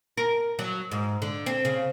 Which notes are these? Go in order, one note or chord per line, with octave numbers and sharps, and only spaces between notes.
A#4
F#3
G#2
D3
C4
C#3